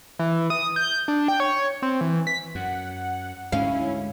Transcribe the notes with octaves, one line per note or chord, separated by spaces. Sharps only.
E3
D#6
G6
D4
G5
C#5
C4
E3
B6
F#2 F#5
D2 G#2 G#3 C#4 E4 F5